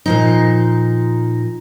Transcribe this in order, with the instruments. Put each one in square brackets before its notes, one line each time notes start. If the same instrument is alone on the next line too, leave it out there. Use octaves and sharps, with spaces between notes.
[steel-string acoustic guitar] A#2 F3 D#4